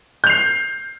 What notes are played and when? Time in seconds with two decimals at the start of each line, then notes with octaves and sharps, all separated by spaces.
0.24 G6
0.27 F7
0.30 C7